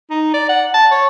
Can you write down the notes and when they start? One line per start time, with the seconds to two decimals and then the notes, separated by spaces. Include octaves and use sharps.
0.10 D#4
0.34 D5
0.49 F#5
0.74 A5
0.91 C#5